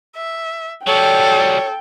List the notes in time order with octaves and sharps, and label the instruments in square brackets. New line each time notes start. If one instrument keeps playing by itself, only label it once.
[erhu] E5
[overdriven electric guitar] F#3 G3 [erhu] A4 [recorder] C#5 [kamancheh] G5